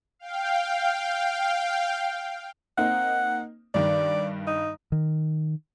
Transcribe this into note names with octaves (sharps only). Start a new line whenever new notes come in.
F5 G5
A#3 C4 D#4 F#5
G2 D#3 D5
D#4
D#3